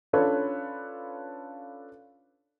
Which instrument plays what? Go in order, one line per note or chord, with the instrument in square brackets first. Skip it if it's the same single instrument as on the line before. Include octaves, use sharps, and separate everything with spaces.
[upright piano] C#4 D4 F4 A4 B4 C#5